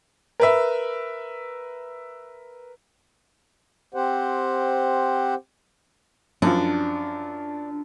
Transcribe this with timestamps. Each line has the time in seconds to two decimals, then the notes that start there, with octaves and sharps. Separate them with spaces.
0.40 A#4 B4 E5
3.94 C4 G4 C5 F#5
6.42 F#2 F3 D4